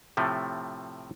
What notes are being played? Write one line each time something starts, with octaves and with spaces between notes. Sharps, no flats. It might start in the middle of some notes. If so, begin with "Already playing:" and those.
A2 C3 F3 A3